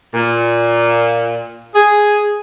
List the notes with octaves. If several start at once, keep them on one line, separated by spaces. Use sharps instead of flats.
A#2
G#4